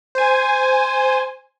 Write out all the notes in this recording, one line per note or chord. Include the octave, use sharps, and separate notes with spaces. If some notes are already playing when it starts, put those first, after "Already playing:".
C5 G#5